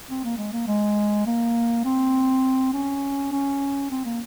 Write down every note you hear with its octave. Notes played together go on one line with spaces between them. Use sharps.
C4
A#3
G#3
A#3
G#3
A#3
C4
C#4
C#4
C4
A#3